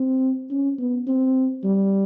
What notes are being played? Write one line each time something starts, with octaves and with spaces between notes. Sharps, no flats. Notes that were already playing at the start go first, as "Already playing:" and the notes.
Already playing: C4
C#4
B3
C4
G3